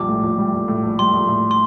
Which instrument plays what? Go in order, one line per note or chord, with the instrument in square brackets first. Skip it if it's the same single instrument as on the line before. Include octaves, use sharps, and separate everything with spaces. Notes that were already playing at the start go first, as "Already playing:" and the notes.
Already playing: [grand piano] A#1 G3 [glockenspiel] D6
[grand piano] A2
A#1
G3
A#1
A2
A#1
[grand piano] G3 [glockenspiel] C6
[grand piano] A#1
A2
[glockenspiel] C6